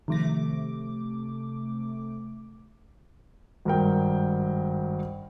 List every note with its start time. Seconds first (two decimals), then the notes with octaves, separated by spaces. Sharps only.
0.08 C3 D#3 F3 A3 D6 A#6
3.65 G#1 G2 A#4 G5